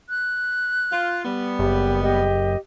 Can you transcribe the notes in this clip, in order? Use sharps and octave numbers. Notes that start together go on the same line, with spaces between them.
F#6
F4
G3 B3
F#1 G4
G4 D#5